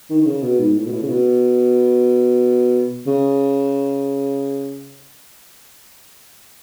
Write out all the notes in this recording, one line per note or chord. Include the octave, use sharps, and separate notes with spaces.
D#3
D#3
C#3
B2
G#2
A2
B2
A2
C#3
B2
C#3